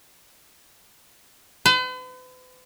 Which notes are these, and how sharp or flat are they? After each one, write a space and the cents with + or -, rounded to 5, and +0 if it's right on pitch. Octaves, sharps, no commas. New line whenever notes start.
B4 +45